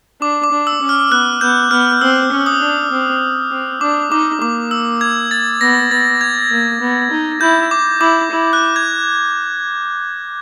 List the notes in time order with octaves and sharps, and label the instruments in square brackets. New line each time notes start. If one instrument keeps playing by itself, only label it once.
[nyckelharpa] D4 [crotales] D6
[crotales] D6
[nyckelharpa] D4
[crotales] E6
[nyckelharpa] C#4
[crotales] F6
[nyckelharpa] B3 [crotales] F#6
[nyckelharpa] B3 [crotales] G6
[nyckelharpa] B3 [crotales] F6
[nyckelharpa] C4 [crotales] E6
[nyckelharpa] C#4
[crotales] D#6
[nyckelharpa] D4
C4
C4
[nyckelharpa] D4 [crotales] D6
[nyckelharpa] D#4 [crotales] D6
[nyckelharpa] A#3 [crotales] D6
[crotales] E6
G#6
A6
[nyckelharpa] B3 [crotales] A#6
[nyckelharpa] B3 [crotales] A6
[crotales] G#6
[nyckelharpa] A#3
B3
D#4
[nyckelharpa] E4 [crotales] G6
[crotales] D6
[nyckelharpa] E4 [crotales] D6
[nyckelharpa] E4
[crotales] F#6
G#6